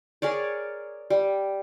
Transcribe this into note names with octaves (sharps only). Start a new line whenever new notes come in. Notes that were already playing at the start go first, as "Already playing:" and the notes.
G#4 A#4 C#5 D5
G3